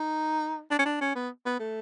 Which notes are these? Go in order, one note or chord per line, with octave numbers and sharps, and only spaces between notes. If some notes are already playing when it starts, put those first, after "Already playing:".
Already playing: D#4
D4
C#4
D4
C#4
B3
B3
A3